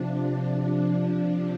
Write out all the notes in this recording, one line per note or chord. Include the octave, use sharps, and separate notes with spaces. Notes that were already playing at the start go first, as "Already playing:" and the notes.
Already playing: C3 F3 D4